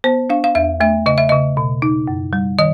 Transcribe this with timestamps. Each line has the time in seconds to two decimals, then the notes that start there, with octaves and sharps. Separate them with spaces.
0.04 B3 C5
0.30 D4 F5
0.44 F5
0.55 E2 E5
0.80 A3 E5
1.06 C#3 D#5
1.18 E5
1.29 C#3 D#5
1.57 B2
1.82 D#4
2.08 F#2
2.33 G3
2.59 D#3 D#5